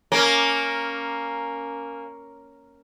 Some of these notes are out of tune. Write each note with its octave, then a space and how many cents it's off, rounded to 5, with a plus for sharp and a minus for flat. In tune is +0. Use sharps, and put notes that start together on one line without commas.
A#3 +0 C#4 +5